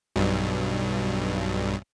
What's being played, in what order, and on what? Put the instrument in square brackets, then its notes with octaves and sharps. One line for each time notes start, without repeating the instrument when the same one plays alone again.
[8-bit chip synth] B1 G2